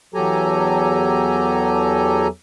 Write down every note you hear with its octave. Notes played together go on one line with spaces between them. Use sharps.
E2 F#3 G4 A4 G#5 A#5